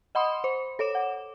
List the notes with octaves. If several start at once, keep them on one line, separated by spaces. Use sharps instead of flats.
D#5 F#5 B5 C6 D#6
C5
A4 C#5 D6 E7
F#5